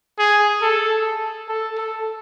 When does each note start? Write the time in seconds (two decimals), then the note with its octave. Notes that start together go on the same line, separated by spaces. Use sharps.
0.18 G#4
0.62 A4
1.49 A4
1.78 A4